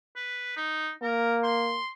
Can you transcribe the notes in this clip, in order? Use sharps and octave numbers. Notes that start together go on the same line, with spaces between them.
B4
D#4
A#3 A#4
C6